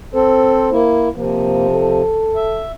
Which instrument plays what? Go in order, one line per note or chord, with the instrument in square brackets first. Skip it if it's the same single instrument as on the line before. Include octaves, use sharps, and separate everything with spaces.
[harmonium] C4 A4 [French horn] C5
[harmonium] A#3 E4
[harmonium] C3 F3 [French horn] A#3
[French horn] A4
[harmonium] E5